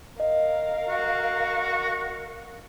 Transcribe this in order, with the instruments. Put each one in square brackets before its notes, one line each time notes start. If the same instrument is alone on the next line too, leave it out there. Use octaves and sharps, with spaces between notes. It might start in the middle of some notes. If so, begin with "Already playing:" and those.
[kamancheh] A#4 F5 [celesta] D#5
[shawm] F#4